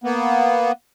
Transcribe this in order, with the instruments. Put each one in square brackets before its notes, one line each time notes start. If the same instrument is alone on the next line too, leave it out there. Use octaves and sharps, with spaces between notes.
[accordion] A#3 B3